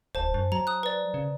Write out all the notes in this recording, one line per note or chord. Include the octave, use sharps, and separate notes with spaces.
D1 C5 A5
F#2 C5
F#3 A#5
D#6 F#6
B4 D5
C#3